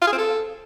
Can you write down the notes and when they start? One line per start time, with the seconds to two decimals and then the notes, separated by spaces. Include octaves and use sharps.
0.02 F4
0.07 G#4
0.13 C4
0.18 A4